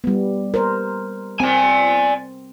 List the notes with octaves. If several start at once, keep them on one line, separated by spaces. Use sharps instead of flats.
G3 B3
A#4 C5
C4 D5 G#5